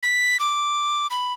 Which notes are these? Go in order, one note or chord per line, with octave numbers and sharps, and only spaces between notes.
B6
D6
B5